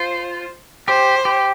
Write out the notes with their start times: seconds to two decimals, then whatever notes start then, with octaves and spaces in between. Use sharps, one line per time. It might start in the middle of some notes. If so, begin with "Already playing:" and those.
Already playing: F4 C5
0.88 G4 C5
1.25 G4